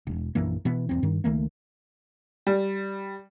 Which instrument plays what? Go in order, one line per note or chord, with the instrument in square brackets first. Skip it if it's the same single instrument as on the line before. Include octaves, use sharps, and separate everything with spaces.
[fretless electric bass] E1
A#1 F#2 E3 A#3
B2 E3 B3
D#1 E2 C4
G2 D#3
C#2 D#3 A3 A#3
[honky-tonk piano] G3